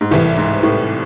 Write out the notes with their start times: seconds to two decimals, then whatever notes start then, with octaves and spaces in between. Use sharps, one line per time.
0.01 G#2
0.11 C2 A2 C3 E3
0.38 G#2
0.63 A2